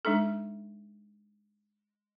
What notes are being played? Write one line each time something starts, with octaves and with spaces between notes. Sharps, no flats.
G#3 D4 D#4 A4